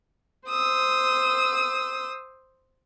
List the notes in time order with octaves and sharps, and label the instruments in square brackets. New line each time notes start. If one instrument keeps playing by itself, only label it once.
[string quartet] C5 D#6 E6